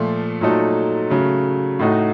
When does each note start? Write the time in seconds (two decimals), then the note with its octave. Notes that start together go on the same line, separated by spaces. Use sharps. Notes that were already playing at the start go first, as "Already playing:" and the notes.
Already playing: A#2 F3 A3
0.41 A#2 F#3 A3 D#4 A4
1.10 C#3 F#3 A3
1.79 A2 A3 D#4 F#4